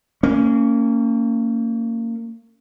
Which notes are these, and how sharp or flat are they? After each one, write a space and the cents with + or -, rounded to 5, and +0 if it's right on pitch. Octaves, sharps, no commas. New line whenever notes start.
A#3 -30 C#4 +0